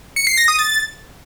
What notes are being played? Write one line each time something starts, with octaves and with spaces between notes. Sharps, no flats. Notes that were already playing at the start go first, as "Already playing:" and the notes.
C#7
C7
A#6
D#6
A6